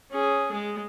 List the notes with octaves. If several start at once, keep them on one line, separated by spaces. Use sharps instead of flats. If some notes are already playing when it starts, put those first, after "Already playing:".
C#4 G#4
G#3